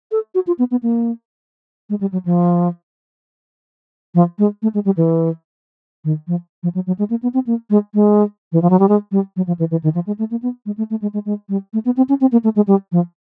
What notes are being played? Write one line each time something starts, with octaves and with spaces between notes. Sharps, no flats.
A4
F#4
F4
B3
B3
A#3
G#3
G3
F#3
F3
F3
G#3
A3
G#3
G3
E3
D#3
F3
F3
F#3
F#3
G#3
A#3
B3
C4
A#3
G#3
G#3
E3
F3
F#3
G3
G#3
G3
F#3
F3
E3
E3
D#3
F3
G#3
A3
A#3
B3
G#3
A3
A3
G#3
G#3
G#3
G3
A3
B3
C4
C#4
C4
A#3
A3
G#3
G3
F3